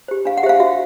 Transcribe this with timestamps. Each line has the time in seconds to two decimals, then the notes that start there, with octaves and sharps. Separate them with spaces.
0.08 G4 C5
0.25 D4 F5
0.38 F#5
0.43 G4 E5
0.46 C5 F5
0.60 F#4 E5